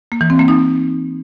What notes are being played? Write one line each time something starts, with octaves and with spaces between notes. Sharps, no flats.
A#3
E3
C4
A#3
D#4